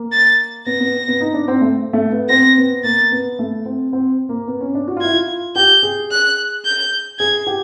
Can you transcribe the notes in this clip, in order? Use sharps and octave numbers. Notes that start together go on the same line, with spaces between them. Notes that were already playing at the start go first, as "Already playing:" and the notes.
Already playing: A#3
A6
B3 A#6
B3
B3
D#4
D4
C4
A3
A3
B3
C4 A#6
B3
A#3 A6
B3
A3
C4
C4
A#3
B3
C#4
D4
F#4
F4
E4 G#6
F4
G4 G6
G#4
F#6
G6
G#4 G#6
G4